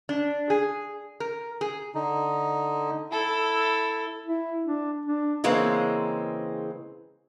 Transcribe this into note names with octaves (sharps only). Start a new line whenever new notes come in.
D4
G#4
A#4
G#4
D3 D#4
E4 A4
E4
D4
D4
C#3 E3 G#3 A#3 C4